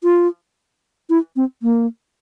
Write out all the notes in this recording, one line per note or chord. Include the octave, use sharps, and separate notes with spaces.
F4
E4
C4
A#3